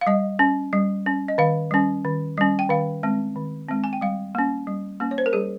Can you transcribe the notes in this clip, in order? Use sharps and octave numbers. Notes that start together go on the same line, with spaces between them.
F5
G3 D#5
C#4
G3
C#4
D#5
D#3 F5
G3 C#4
D#3
G3 C#4
G5
D#3 F5
G#3 C4
D#3
G#3 C4
G#5
G5
G3 F5
A#3 C#4
G3
A#3 C#4
C#5
C5
A#4
G3 G#4